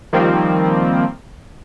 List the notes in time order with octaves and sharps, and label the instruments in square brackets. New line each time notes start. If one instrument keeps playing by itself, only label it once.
[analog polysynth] D#3 F3 G3 A#3 C4